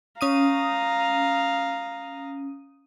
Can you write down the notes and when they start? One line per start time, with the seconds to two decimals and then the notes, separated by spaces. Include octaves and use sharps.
0.21 C#4 F5 A#5 D#6 D#7